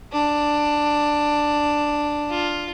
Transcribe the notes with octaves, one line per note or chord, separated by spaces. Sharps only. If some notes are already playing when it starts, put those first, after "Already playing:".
D4
F4